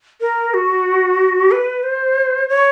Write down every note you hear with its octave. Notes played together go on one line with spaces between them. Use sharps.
A#4
F#4
B4
C5
C#5